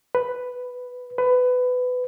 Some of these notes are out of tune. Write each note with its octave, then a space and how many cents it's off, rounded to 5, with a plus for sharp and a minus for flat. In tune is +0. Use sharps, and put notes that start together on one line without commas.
B4 +5
B4 +20